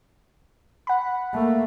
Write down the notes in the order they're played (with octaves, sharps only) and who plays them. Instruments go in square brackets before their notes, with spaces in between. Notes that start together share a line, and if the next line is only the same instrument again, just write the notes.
[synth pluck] F#5 B5
[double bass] A3 A#3